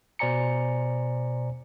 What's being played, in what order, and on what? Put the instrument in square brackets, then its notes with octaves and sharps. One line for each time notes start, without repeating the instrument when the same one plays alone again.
[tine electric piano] B2 C5 D5 G#5 A#5 C#7